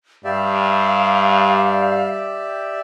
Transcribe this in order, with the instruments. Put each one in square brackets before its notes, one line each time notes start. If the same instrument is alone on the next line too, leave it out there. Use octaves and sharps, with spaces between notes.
[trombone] G2 [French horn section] G3 [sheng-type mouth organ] G4 D5 E5 [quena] F5